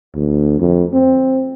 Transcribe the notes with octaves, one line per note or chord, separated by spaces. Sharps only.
D2
F2
C4